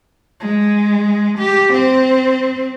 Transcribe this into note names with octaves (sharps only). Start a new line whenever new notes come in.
G#3
G4
C4